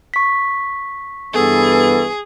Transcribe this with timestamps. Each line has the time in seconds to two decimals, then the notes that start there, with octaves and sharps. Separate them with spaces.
0.14 C#6 B6
1.34 G2 E3 B3 G#4 A4